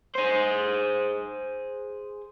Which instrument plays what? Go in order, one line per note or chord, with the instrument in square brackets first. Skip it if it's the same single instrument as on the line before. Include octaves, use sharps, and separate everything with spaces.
[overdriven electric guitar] G#4 C5